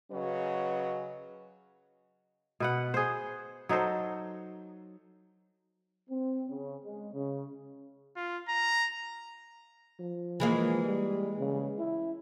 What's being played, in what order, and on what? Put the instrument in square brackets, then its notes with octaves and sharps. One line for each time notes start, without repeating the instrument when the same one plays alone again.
[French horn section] C#3 F#3 C#4 B4 D#5
[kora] B2 B4 F#5
G#4 C5
F#3 D#4 A4 C5
[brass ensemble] C4
C#3
G#3
C#3
[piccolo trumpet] F4
A#5
[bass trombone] F3
[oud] E3 G#3 A#3
[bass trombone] G3
C#3
E4